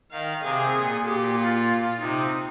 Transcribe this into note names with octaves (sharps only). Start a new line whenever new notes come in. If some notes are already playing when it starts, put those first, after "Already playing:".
D#3 F5
C3 G#4
A#2
A#2 G4
F4
C3 D#4